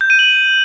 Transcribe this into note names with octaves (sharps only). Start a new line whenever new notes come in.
G6
D#7
F#7